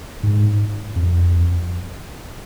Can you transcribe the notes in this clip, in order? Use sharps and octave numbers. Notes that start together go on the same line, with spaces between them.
G#2
F2